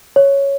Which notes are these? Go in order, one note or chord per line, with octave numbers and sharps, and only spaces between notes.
C#5